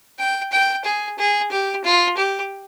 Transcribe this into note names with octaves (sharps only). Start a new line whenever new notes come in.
G5
G5
G#4
G#4
G4
F4
G4